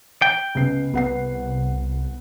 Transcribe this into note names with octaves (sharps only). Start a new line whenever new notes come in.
G5
C#2 B3 C7
C2 B3 F#5 C7